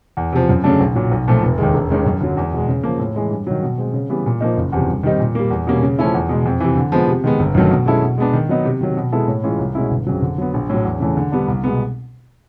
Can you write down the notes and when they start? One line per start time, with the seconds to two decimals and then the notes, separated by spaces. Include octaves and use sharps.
0.17 E2
0.32 C3 F3
0.49 F#2
0.64 C#3 F#3 A3 D4
0.80 B1
0.95 A#2 F#3
1.11 B1
1.28 A#2 F3 A3
1.43 F1
1.58 D#2 D#3 G#3
1.74 E1
1.90 D#2 D#3 G#3 C#4
2.06 F#2
2.21 D3 F#3
2.37 E2
2.53 B2 G#3
2.68 C#3
2.83 F3 A#3
2.99 A2
3.16 E3 G#3
3.31 G2
3.47 D#3 F#3
3.63 B2
3.78 G#3 C4
3.94 C#3
4.10 E3 G3 B3
4.26 A#2
4.41 F3 A#3 D#4
4.57 F#1
4.72 E2 C3 F3
4.88 G2
5.03 D#3 G3 C4 D#4
5.20 A#2
5.35 G3 A#3
5.50 E2
5.67 B2 G3 A#3 C#4
5.83 C#3
5.99 F3 A3 C#4 E4
6.14 E2
6.29 B2 G#3
6.45 F2
6.60 C3 E3
6.77 D3
6.92 F3 G#3 B3
7.08 C3
7.24 D#3 G#3 B3
7.40 G1
7.55 F#2 D#3 F#3 A3
7.71 B2
7.86 G#3 C#4 E4 A4
8.02 B2
8.18 G#3 B3 D4
8.33 D#3
8.49 F#3 B3 D#4
8.65 C3
8.81 D#3 F#3
8.97 B2
9.12 G#3 B3 E4 A4
9.28 A2
9.44 E3 G#3 C#4 F4
9.59 C2
9.75 B2 G#3 C#4 E4
9.91 G1
10.07 F2 C#3 F#3
10.22 D3
10.38 F#3 B3
10.54 A#1
10.69 A2 F#3
10.85 E2
11.00 C#3 E3 A3
11.17 D3
11.32 G3 B3 D4
11.48 C2
11.64 B2 G#3 B3